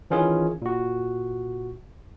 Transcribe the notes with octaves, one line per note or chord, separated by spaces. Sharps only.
D#3 E3 C#4 F4 G#4
A#2 F#4